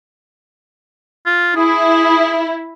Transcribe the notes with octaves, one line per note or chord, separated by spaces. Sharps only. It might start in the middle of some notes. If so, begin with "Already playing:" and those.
F4
E4 G#4